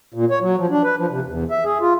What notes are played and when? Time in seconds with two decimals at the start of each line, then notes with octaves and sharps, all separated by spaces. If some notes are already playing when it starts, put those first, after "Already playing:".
0.14 A#2
0.30 C#5
0.41 F#3
0.58 F3
0.70 D4
0.84 B4
0.98 F3
1.10 C3
1.27 E2
1.51 E5
1.64 G#4
1.81 F4